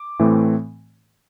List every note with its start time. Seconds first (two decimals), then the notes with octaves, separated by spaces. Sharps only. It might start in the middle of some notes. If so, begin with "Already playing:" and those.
Already playing: D6
0.19 A2 E3 A3 C4